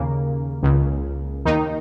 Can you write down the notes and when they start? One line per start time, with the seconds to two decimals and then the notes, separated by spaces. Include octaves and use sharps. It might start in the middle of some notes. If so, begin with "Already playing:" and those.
Already playing: D#2 C#3 A#3
0.63 C#2 C#3
1.45 D#2 D#3 D#4